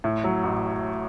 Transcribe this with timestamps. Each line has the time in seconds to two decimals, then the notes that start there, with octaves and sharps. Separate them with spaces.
0.04 A2
0.24 F#3
0.43 A1